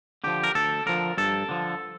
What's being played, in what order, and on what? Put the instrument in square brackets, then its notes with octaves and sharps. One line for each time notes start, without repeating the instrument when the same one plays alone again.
[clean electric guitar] D3 F3 G4
A#4
D2 A4
D3 F3 A#4
G2 A4
D3 F3